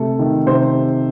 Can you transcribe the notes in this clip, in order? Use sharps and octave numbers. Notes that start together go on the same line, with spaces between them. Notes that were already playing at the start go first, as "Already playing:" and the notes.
Already playing: C3 A3 A4
D#3
C3 C5